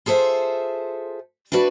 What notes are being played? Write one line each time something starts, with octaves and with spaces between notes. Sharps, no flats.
F4 G#4 A4 C5 E5
D4 E4 F#4 B4 D5